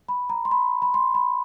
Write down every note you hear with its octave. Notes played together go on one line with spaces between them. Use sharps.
B5
A#5
C6
B5
B5
C6
B5